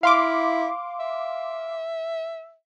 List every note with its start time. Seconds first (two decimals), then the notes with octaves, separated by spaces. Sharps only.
0.03 E4 F5 C6 D6
1.00 E5